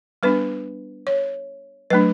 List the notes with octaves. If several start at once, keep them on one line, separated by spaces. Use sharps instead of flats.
G3 B3 D4 B4
C#5
F#3 A3 D4 B4